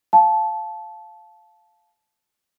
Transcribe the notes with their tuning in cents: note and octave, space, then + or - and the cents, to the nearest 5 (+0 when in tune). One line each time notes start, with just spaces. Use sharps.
F5 +0 A5 -15